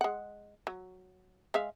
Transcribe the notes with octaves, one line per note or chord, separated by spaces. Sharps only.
G#3 F#5
F#3
G#3 E5 F5